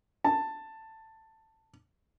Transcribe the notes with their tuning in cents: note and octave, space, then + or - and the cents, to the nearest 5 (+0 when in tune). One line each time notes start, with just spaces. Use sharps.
A5 +10